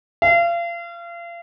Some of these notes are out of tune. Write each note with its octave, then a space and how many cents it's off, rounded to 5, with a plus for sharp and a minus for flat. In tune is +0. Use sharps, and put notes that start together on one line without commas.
F5 -35